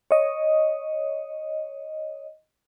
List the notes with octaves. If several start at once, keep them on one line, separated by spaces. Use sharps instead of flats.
C#5 D#5